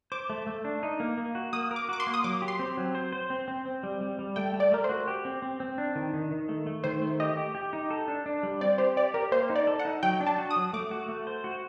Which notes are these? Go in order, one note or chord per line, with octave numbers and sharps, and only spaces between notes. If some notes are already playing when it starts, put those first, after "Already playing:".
C5 D6
A3
A3
D4
D#4
A#3
A#3
F#4
A#3 D#6
A#4
D6
F#4 D6
C6
A#3
D#6
F#3 D6
G4
C6
C4
F#3
C5
C5
C4
C4
C4
G3
G3
G3
A3 G5
A3
D5
A3 A#4
C5
F#4
G4
C4
C4
C4
D4
D#3
D#3
D#3
A3
A3
D#3 C5
A3
G4 D#5
G4
G4
D#4
A4
D4
D4
G3
C4 D5
G4 C5
G4 D5
G4 A#4
A#3 C5
D#4
D5
A4
F#5
D#4
F#3 G5
D4
A5
F#4
D#6
F#3
A3 D6
F#4
A3
C5
F#4